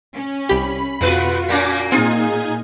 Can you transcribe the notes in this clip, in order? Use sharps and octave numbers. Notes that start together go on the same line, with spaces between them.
C#4
C2 G4 B5
F2 B2 F4 F#4 B4
A#2 A#3 C#4 D6 A#6 B6
A#2 C4 D#4 F4 G#4 G#5